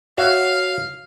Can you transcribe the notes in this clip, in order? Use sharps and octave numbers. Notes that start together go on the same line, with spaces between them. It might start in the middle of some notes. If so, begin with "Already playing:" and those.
F#4 C#5 E5 F5